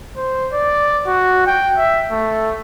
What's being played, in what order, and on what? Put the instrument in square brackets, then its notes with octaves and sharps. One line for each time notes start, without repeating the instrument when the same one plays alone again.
[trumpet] C5
D5
F#4
G5
E5
A3